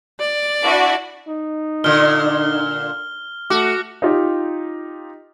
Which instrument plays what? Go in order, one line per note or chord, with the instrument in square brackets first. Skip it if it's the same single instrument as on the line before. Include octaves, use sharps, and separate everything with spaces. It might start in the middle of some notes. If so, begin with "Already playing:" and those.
[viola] D5
[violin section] D4 E4 F#4
[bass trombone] D#4
[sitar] A#2 D3 [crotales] F6 G7
[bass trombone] A3 [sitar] F#4 [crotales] D6
[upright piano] D#4 F4 G4